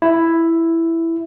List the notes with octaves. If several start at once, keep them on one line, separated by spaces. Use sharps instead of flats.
E4